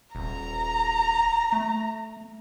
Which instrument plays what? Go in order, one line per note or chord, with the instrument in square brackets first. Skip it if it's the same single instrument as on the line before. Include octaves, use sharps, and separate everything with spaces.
[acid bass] D#1 [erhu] A#5
[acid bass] A3